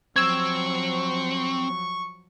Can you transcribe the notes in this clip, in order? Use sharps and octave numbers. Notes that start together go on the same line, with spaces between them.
F3 F#3 C4 C#6 E6 G#6